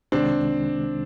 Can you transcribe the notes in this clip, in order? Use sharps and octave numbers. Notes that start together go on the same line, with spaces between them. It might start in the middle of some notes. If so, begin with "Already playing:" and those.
C2 C3 D#3 G#3 C4 D4